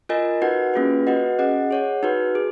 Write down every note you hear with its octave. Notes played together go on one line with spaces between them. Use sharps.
F4 A#4 D#5 G#5
D#4 F#4 B4 F#5
A#3 C#4 F4 G#4 B4
F#4 B4 D#5 F#5
C#4 G#4 D#5 F#5
G#4 C#5 F#5
D#4 F#4 B4
G#4